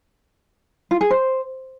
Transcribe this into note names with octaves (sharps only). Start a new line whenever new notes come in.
F4
G#4
C5